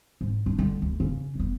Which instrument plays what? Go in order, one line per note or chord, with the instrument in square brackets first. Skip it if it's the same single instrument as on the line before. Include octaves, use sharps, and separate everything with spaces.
[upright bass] G#2
D4
D3 G#3
D2
C#3 C#4
F1 B3